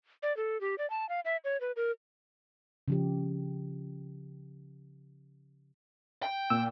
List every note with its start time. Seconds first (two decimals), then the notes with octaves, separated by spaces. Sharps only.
0.23 D5
0.37 A4
0.61 G4
0.78 D5
0.90 A5
1.09 F5
1.25 E5
1.44 C#5
1.61 B4
1.76 A#4
2.88 C#3 F3 G4
6.23 G5
6.50 A#2 E6